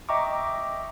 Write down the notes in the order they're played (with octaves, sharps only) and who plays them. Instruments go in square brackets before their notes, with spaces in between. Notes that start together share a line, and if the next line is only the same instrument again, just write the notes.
[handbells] D#5 E5 G5 A#5 C#6 D6